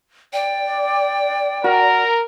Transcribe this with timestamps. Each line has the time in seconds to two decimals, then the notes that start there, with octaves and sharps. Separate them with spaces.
0.33 D5 G5
1.64 F#4 A#4